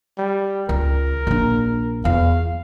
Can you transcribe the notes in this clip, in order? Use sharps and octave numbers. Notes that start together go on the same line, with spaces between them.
G3
C#2 A#4
A#1 D4
E2 F5